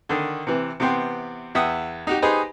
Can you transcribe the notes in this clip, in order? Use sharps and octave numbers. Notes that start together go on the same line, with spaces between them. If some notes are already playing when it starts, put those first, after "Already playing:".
D3 D#3
C3 E3
C3 E3 B3 G5 C6
E2 E5 F#5 G5 D#6
D#4 F#4 G4
D#4 G4 G#4 B4 C5 D#5